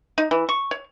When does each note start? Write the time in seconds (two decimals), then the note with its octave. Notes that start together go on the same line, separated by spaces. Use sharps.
0.18 D#4
0.31 E3
0.49 C#6
0.71 C#5